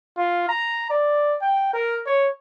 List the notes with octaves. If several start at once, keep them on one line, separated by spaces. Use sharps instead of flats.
F4
A#5
D5
G5
A#4
C#5